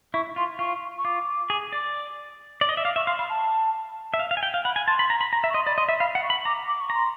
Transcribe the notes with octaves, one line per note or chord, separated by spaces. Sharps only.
E4 C#6
F4 C6
F4 C#6
C#6
F4 D6
G#4
D5
D5
D#5
E5
F5 D6
E5 C#6
F5 C6
F5 B5
A5
E5
F5
F5
G#5
G5
F5
F#5 B5
G#5
A5 C6
B5
A#5
B5
A#5
E5
C#6
D#5 C6
D5 B5
D#5 C6
E5
F5 B5
F#5
C#6
B5
A#5 D6
D6
C#6
A#5
C6